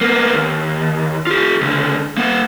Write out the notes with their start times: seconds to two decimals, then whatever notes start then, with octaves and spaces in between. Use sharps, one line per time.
0.01 A#3 B3
0.34 D#2
1.27 F4 G4
1.61 C#2 D3
2.17 A#3 F#5